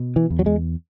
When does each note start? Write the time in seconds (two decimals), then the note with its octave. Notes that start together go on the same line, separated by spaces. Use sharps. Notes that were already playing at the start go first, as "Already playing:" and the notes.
Already playing: B2
0.16 E3
0.30 E2
0.39 F#3
0.46 G#3